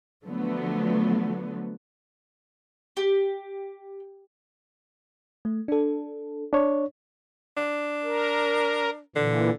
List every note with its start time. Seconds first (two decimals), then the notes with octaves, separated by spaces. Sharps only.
0.25 D3 F3 F#3 A3 B3
2.97 G4
5.45 A3
5.68 D4 A4
6.53 D4 C#5
7.57 D4
8.04 A#4
9.16 A#2 D3 E3